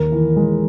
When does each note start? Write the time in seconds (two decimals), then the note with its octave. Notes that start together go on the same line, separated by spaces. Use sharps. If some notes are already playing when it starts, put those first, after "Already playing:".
Already playing: D#2 A#4
0.12 E3
0.36 G#3